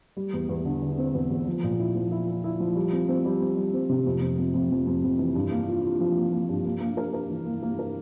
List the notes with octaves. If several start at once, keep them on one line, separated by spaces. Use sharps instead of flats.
G3
E2
E2
D3
D3
C4
E2
E2
F3
A#2
E4
F3
E4
E4
E4
F3
G3
C4
C4
G3
C4
G3
C4
C3
F2
F2
F2
F2
F2
F2
F2
E3
G2
A#3
F4
F4
F3
A#3
A#3
G2
A#3
A#3
A#4
A#4
E3
A#3
A#3
A#4